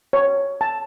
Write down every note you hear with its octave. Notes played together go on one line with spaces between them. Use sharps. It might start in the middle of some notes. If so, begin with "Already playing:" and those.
C#5
A5